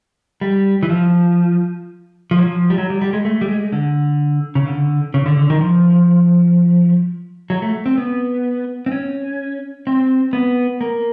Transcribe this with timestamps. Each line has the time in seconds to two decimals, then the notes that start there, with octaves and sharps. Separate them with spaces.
0.41 G3
0.83 E3
0.89 F3
2.31 F3
2.39 F#3
2.47 F3
2.70 G3
2.78 F#3
2.90 G3
3.02 G3
3.13 G#3
3.25 A3
3.41 G3
3.48 G#3
3.72 D3
4.55 C#3
4.67 D3
5.14 C#3
5.26 D3
5.37 D3
5.50 D#3
5.61 F3
7.50 F#3
7.62 A3
7.86 C4
7.98 B3
8.86 C4
8.91 C#4
9.87 C4
10.33 B3
10.81 A#3